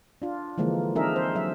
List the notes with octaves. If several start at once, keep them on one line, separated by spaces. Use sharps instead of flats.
D4 F4
D3 E3 F3 G#3 A#3
C4 D4 D#4 G#4 A#4 E5
C5
F#3 E5